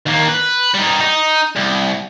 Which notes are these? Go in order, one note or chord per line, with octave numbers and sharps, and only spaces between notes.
D#2 A#3
B4
G3 D#4
D#4
C2